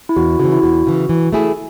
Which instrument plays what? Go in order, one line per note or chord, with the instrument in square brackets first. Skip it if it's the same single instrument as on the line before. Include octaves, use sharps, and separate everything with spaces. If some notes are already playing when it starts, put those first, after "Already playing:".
[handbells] E4
[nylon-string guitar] E2 [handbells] F#4
[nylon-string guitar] C#3 E3 [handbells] F#4
[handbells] E4
[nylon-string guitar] E2 [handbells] F#4
[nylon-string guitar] C#3 E3
E3
A3 E4 G#4